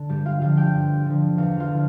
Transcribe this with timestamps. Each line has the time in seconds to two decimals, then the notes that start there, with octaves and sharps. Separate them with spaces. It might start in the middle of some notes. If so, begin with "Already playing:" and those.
Already playing: D3
0.09 G2 G3 G4
0.25 F4 F5
0.41 D3 F3 F4 F5
0.57 G4 G5
0.73 G2
1.06 D3 F3
1.37 E2 F4 F5
1.60 F4 F5
1.70 D3 F3